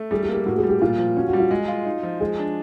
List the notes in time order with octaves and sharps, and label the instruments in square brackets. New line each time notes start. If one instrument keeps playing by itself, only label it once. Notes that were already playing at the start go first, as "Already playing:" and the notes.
Already playing: [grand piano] A3
[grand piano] G3 [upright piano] G#4
[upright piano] G4
[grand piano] A#3
[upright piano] G4
[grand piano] A2 [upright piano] F#4
[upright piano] G#4
[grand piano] G3
[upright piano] G4
[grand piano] A#2 [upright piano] F4
[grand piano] F3
[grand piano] C#4 [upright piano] F#4
[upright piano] F#4
[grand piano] G3
[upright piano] F4
[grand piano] G#3
F4
D#4
F3
[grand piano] G#3 [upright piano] G#4
[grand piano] D4